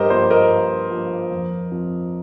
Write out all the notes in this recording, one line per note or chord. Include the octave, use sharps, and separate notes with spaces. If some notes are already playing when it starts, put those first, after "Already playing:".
Already playing: G2 G4 A#4 C5 D#5
F3 A#3 G4 C5
A#4 D#5
G2
F3 A#3
F2
F3 C4